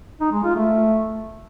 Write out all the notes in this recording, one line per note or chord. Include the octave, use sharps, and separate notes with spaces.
D#4
G#3
F4
A3